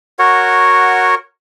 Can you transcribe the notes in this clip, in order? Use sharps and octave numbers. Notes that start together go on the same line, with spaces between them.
F#4 A#4 C#5 F#5